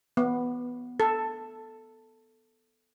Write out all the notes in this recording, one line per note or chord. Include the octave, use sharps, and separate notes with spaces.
B3
A4